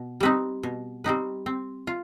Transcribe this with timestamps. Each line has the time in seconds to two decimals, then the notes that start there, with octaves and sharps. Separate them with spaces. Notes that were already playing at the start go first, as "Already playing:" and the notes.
Already playing: B2
0.20 G3 C4 D#4 B4
0.63 B2
1.04 G3 C4 D#4 B4
1.46 C4
1.87 F4